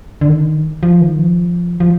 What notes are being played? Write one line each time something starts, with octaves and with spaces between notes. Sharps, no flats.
D3
D#3
F3
D#3
F3
F3